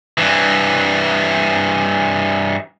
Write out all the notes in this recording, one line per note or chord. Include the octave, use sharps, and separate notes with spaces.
G2 E3